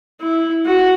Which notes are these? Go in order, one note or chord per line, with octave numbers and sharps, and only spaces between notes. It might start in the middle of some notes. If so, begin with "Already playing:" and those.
E4
F#4